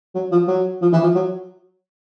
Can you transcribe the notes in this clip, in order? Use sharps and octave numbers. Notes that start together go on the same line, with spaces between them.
F#3
F3
F#3
F3
E3
F3
F#3